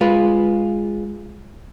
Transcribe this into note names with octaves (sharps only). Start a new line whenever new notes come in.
G#3 F4 B4